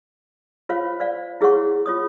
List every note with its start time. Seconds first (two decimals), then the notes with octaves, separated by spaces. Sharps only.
0.69 F4 C5 C#5 F5
1.00 C5 D5 F5
1.41 E4 G#4 C#5 F#5 C#6
1.86 F4 C#5 D#6